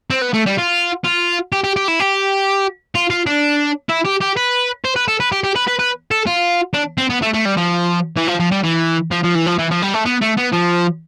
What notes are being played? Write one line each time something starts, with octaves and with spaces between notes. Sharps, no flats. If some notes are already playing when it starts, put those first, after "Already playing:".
C4
B3
A3
G3
F4
F4
G4
G4
G4
E4
G4
F4
F4
D4
E4
G4
G4
B4
C5
B4
A4
B4
G4
G4
B4
B4
B4
A4
F4
D4
C4
B3
A3
A3
G3
F3
E3
F3
F3
G3
E3
F3
F3
E3
F3
E3
F3
G3
A3
B3
A3
B3
F3